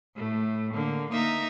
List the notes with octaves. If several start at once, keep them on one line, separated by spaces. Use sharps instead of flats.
A2 A3
D3 A#3
A#3 D#4 E5 A#5